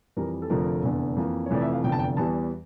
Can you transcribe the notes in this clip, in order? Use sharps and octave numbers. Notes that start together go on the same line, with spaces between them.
F2 E3 G3 A#4
A4
F1 F2 D3 F3 A3 A#4
F1 E2 D3
F2 E3 A#3
C#5
F1 F2 E3 A3 D5
E5
F5
F1 E2 D3 F3 G5
A5
G5
E2 E3 G3 A5